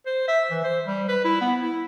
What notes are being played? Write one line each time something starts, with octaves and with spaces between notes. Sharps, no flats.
C5
E5
E3
C5
G3
B4
E4
B3
E4